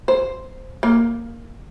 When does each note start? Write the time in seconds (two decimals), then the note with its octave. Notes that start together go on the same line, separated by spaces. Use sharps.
0.08 C5
0.83 A#3